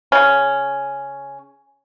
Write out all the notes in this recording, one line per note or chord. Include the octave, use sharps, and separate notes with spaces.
C#3 C#4